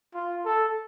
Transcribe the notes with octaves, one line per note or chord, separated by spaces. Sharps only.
F4
A4